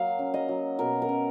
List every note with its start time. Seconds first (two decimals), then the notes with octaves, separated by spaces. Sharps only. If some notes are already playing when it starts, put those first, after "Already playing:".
Already playing: F#3 A#3 F5
0.19 C#4
0.34 D#5
0.49 F#3
0.79 B2 A#4
1.02 A#4
1.09 C#4